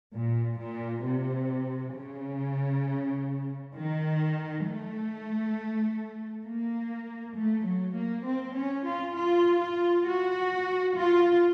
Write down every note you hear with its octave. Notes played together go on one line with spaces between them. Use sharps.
A#2
A#2
C3
C#3
D#3
A3
A#3
A3
F#3
A#3
C4
C#4
F4
F4
F4
F#4
F4